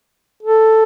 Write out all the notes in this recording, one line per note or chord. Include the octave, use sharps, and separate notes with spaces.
A4